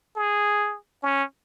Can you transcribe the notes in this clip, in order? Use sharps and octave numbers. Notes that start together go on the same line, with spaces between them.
G#4
C#4